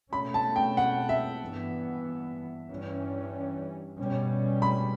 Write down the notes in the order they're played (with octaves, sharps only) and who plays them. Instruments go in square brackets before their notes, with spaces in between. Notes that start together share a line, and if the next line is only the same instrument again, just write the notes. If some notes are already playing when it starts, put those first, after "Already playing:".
[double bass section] B2 A3 C#4 [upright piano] B5
[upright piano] A5
G5
F#5
E5
[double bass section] G2 E3 B3
G2 E3 G3 C#4
B2 G3 C#4
[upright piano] B5